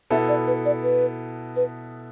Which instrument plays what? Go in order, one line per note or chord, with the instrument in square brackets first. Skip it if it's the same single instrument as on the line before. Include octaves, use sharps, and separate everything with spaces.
[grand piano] B2 B3 E4 A4 [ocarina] E5
[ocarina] D5
B4
D5
B4
B4